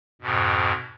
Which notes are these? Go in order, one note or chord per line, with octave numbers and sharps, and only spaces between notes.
F2 G#2 B2